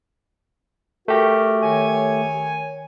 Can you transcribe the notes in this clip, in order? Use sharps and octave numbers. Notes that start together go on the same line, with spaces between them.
A3 F#4 G4 A#4
D#3 C#5 G#5